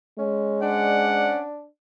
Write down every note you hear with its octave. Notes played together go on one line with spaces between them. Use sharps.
G#3 C#4
C#4 D4 C5 D5 F#5